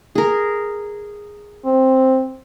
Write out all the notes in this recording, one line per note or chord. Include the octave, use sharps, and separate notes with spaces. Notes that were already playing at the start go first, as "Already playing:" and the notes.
G#4 A#4
C4